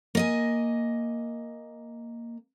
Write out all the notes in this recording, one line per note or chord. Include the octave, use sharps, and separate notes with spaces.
A#3 D#5 G#5